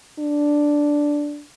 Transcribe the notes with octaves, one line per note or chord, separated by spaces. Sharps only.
D4